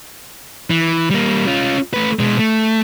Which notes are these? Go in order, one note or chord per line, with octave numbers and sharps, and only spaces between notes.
E3
G3 A#3
C#4 F4
A3 B4
B2 G#3
A3